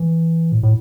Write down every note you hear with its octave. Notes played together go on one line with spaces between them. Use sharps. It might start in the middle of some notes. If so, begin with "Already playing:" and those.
Already playing: E3
A2
A2